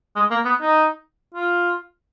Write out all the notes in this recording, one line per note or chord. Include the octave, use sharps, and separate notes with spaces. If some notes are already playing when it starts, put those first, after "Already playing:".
G#3
A#3
B3
D#4
F4